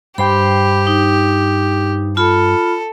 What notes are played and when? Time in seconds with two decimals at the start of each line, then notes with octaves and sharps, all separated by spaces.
0.18 G2 G4 C5 G5 B5
0.87 D#4
2.17 F4 A4 B5